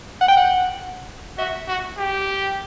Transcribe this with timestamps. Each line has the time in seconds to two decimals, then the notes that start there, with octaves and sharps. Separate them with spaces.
0.21 F#5
0.29 G5
0.37 F#5
1.38 F#4 E5
1.68 F#4
1.97 G4